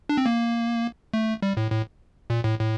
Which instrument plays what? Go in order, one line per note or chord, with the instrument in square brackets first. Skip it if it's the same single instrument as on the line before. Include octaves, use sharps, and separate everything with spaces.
[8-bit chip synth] D4
C4
A#3
A3
G3
A2
A2
A#2
A2
A2